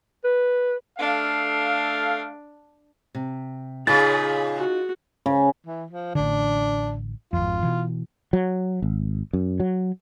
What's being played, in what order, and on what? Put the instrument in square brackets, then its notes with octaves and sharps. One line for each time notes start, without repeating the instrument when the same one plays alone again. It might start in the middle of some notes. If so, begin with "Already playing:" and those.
[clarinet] B4
[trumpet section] A3 A4 F5 [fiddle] D4
[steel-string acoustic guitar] C3
[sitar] A#2 C#3 [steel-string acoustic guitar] D#4 F4 [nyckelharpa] G#4 B5 [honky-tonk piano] A6
[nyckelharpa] F#4
[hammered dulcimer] C#3
[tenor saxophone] E3
F3
[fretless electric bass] A1 D3 [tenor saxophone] D4
[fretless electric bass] G#1 F2 [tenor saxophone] F4
[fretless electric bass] B2 E3
F#3
G#1
F#2
F#3